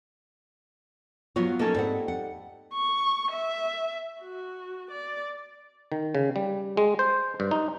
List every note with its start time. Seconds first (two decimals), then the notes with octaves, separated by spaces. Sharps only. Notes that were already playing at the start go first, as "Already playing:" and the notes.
1.36 G2 F#3 B3 F4 F#4 C#5
1.59 A#3 C#4 D#4 A4
1.74 G#2 G3 C4 F#5
2.08 F#5
2.74 C#6
3.31 E5
4.21 F#4
4.91 D5
5.92 D#3
6.15 C#3
6.36 G3
6.77 G#3
6.99 C5
7.40 G2
7.51 D#4